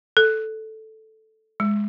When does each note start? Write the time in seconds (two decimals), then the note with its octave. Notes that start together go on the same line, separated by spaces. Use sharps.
0.17 A4
1.60 G#3